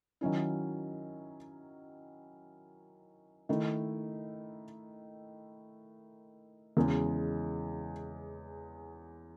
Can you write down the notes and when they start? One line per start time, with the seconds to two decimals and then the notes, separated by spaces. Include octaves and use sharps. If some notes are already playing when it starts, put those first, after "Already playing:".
0.21 D#3 F#3 C#4 E4
3.49 D#3 A3 E4
6.77 E2 C#3 G#3